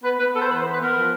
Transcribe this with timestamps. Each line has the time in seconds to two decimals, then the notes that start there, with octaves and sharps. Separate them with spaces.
0.03 B3 B4
0.19 B3 B4
0.34 B3 A4
0.42 C5
0.49 E3 B4
0.60 C5
0.64 B3
0.72 B4
0.80 B3 A#4
0.95 F3